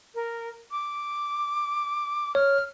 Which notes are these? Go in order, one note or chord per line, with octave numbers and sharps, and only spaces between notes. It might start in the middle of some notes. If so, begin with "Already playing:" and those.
A#4
D6
C#5 F6